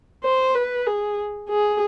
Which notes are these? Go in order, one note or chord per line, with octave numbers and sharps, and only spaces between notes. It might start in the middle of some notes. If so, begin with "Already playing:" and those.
C5
B4
G#4
G#4